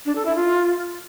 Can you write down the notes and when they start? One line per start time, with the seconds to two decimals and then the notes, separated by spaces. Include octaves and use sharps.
0.05 D4
0.15 A4
0.25 E4
0.35 F4